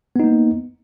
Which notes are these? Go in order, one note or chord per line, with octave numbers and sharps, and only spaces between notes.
A#3 B3 D#4